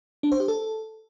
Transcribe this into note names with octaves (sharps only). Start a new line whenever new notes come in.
D4
C5
G4
A4